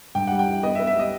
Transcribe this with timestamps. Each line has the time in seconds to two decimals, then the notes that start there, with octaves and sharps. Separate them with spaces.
0.15 G2 G5
0.27 G3 F#5
0.39 G5
0.47 E3
0.63 B3 D#5
0.75 E5
0.80 B3
0.87 E5
0.96 G3 D#5